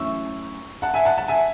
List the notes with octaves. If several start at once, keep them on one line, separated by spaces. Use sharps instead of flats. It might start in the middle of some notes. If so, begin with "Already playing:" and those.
Already playing: F#2 E3 A3 C#4 C#6 E6
F#5 A5
E5 G#5
F#5 A5
F#5 A5
E5 G#5